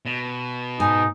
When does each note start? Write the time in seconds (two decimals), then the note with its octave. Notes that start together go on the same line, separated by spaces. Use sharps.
0.05 B2
0.80 G#2 D#4 G#5